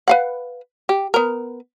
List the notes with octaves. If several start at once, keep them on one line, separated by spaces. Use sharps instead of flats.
B4 F5 F#5
G4
B3 A#4